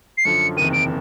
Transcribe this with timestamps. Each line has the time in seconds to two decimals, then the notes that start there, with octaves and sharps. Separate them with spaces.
0.18 C7
0.25 F#2 D3 F3 C#7
0.57 F#1 E2 C3 D#3 D#7
0.73 D7